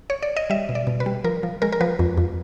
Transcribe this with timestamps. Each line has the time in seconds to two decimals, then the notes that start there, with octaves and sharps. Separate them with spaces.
0.10 C#5
0.22 D5
0.36 D#5
0.50 G3 E5
0.69 B2
0.75 D5
0.87 B2
1.00 B4
1.06 G3
1.24 F3 A#4
1.43 F3
1.62 G#3 A#4
1.72 A#4
1.81 F3 B4
1.99 F2
2.17 F2